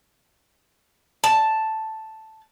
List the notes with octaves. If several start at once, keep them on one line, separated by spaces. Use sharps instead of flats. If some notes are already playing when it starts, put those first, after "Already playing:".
A5